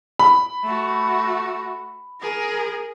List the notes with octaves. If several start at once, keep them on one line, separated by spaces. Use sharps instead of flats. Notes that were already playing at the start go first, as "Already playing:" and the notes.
B5
A3 F#4
G#4 A#4